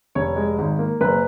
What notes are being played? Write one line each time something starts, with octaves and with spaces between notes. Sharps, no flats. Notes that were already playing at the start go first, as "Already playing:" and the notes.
F1 C#5
G#3
G#1
A#3
F#1 B4